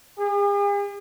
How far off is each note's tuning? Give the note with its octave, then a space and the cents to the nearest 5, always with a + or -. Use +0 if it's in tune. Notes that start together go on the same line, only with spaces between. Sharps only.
G#4 -45